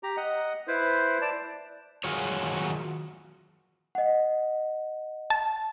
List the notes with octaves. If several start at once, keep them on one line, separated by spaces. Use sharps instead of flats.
G4 A#5
D#5 F#5
E4 B4 C5
D5 A5
D#3 F#3 F4 F#4 G#4 C#5
D#5 F#5
A5